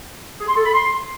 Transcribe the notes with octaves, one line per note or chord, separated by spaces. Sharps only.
G#4
C6
A4
B5
C6